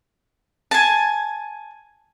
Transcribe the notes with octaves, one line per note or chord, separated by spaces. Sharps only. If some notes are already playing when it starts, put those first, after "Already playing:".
G#5 A5